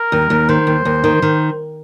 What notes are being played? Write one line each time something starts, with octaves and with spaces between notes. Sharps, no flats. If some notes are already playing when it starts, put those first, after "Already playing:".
Already playing: A#4
D#2
D#2
D#3 C5
D#2
D#2
D#3
D#3